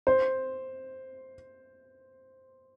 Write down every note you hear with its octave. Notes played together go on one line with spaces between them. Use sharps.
C5